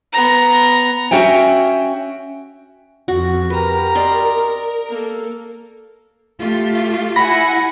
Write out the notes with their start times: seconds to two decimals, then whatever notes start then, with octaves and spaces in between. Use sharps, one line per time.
0.13 B3 A#5
1.11 C#4 F#4 E5 G5 G#5
3.08 F2 F#4
3.50 G4 A#4 B4 A#5
3.95 D5 D#5 C6
4.90 A#3 A4
6.39 A3 F4 G4
7.16 E4 F#5 G#5 B5 A#6